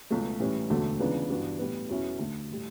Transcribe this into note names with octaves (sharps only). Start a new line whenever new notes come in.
C#2 B2 F#3 A3
A2 E3 G3 C#4
E1 D2 D3 F#3 A3
C#2 C#3 E3 B3 D4
G2 E3 B3 D4 F#4
A2 G3 B3
E2 B2 F#3 C#4 E4
D2 D3 A3
A2 G3